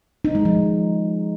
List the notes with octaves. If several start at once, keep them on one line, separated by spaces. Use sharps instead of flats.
D#4
G#3
F3